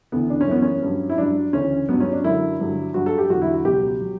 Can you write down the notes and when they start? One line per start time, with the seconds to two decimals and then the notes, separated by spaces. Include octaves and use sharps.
0.12 D2 C#3 E3 B3
0.30 D4
0.41 C#4
0.47 F#2 E3 B3
0.62 C#4
0.82 G2 F#3
1.09 E4
1.18 G2 F#3 D4
1.53 D2 C#3 E3 C#4
1.89 G2 F#3 B3
2.00 C#4
2.12 D4
2.24 F#2 D3 F#3 E4
2.59 G2 D3 F#3
2.94 G2 F#3 F#4
3.06 A4
3.18 G4
3.30 E2 D3 F#3 F#4
3.42 E4
3.53 F#4
3.65 C#2 B2 F#3 G4
4.01 F#3